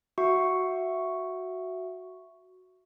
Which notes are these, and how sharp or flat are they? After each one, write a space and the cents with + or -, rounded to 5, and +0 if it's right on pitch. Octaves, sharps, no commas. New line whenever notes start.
F#4 +0 E5 +10 C#6 +0